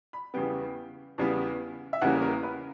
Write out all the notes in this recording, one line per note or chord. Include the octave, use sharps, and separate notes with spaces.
B5
E2 C#3 G3 B3 G5
E2 C#3 G3 B3
E5
E2 C#3 G3 A#3 C#4 F#5
A#4
B4